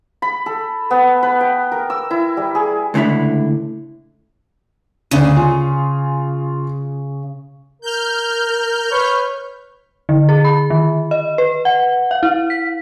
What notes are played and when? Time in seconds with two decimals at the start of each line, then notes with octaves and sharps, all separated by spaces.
0.22 B5
0.46 A4
0.90 B3
1.23 B4
1.41 G5
1.72 A#4
1.90 E6
2.11 E4
2.37 G3
2.55 G#4
2.94 C#2 A2 D3 E4 B5
5.11 D2 C#3 D4 D#7
5.36 F4 G#5
7.82 A#4 F6 G6
8.91 B4 C#5
10.09 D3
10.29 G#4
10.45 B5
10.70 D#3
11.11 D#5
11.38 B4
11.65 F#5
12.11 F5
12.23 E4
12.50 B6